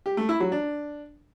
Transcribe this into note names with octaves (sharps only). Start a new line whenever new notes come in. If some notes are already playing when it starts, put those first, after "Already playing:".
G4
A3
E4
F#3
D4